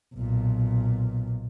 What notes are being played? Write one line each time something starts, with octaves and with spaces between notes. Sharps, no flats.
B1 A#2